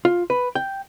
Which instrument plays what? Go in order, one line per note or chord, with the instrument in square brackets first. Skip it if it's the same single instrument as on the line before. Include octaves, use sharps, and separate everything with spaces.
[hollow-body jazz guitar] F4
B4
G5